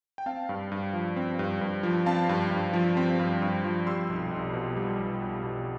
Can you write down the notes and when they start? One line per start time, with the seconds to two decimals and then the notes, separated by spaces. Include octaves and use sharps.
0.18 G5
0.26 C4 F5 A5
0.49 G2
0.72 G2
0.93 F3
1.16 C4
1.39 G2
1.61 G2
1.83 F3
2.06 C4 F5 A5
2.29 G2
2.51 G2
2.73 F3
2.97 C4
3.19 G2
3.42 G2
3.64 F3
3.87 G3 C6 E6
4.09 B1
4.31 B1
4.54 B2
4.77 G3
4.99 B1
5.22 B1
5.44 B2